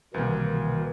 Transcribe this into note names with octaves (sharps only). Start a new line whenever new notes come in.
C2 B2 D#3 E3 A#3